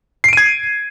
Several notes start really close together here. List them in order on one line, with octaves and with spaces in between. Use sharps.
C7 D7 D#7 G#6